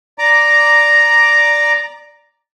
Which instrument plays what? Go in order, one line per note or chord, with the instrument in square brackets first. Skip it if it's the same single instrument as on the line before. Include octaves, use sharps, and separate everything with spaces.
[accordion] D5 A#5 D6